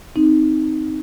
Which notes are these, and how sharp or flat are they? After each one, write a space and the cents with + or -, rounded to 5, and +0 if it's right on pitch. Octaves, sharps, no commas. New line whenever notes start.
C4 +0 D#4 +0